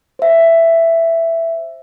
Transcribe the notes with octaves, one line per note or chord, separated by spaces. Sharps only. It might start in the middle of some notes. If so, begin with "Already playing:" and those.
C5 E5